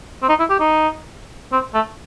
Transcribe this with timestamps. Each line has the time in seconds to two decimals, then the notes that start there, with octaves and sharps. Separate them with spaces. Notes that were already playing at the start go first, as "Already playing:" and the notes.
0.23 C4
0.29 D#4
0.39 E4
0.50 G4
0.60 D#4
1.52 C4
1.74 A3